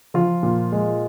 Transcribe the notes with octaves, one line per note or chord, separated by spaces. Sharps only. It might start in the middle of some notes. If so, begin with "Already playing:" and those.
F3 F4
A#2
G#3